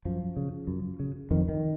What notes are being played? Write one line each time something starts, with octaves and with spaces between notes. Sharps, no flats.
F#2 F3
C#3
F#2
C#3
F2 D#3
D#3